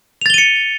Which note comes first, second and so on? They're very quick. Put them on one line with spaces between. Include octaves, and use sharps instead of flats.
F7 A6 G7 D#7 C#7